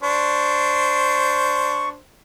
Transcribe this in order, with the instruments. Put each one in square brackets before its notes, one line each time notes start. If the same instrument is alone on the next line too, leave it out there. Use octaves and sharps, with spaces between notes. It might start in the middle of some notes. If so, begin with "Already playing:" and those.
[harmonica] D4 C5 [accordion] C#6